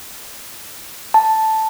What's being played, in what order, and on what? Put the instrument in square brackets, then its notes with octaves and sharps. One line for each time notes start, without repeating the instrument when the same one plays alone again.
[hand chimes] A5